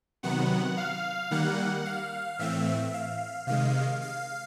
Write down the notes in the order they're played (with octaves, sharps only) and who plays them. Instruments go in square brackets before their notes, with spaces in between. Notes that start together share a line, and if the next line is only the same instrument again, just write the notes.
[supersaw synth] C3 D#3 F#3 B3 F#5
F5
D#3 G3 A#3 F#5
F5
A2 E3 A3 C4 E5
F5
C3 D#3 G#3 F5
F5